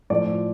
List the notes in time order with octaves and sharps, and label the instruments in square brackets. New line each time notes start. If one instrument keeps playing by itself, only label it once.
[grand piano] A2 F3 D5